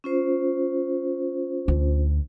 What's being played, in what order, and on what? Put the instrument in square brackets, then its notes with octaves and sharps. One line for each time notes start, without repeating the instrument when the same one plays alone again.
[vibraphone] C#4 F4 C5
[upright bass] D2